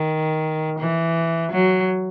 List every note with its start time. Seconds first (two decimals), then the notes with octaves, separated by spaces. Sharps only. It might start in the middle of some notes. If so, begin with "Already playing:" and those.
Already playing: D#3
0.79 E3
1.52 F#3